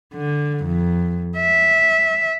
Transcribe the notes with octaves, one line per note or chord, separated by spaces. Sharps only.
D3
F2
E5